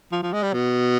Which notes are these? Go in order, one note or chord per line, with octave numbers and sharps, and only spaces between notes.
F3
F3
G#3
G3
B2